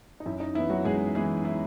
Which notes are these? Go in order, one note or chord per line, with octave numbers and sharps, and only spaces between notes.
D#4
F#2 E4
D#4
E3 B3 E4
F#3 F#4
F#2 G#3 G#4
E3 G#3 B3 G#4
E4